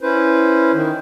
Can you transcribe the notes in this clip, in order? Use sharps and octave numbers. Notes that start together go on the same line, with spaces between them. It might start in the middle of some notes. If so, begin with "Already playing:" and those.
C#4 E4 B4 C5
D#3